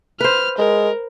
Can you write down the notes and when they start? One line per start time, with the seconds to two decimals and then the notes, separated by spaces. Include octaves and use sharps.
0.21 B4 C5 F6
0.58 G#3 A#4